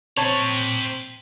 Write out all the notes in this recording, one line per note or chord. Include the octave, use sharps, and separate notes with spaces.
C4 C5 C#5 A5 A#5